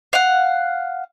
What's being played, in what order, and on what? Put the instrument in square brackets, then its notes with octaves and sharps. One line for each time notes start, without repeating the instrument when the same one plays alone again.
[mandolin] F5 F#5